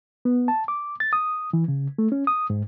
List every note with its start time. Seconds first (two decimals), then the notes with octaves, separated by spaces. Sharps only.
0.25 B3
0.48 A5
0.68 D6
1.00 A6
1.13 D#6
1.53 E3
1.68 C#3
1.98 A3
2.12 C#4
2.27 D#6
2.50 G#2